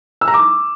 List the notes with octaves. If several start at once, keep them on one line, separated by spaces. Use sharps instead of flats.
E6
A#5
D6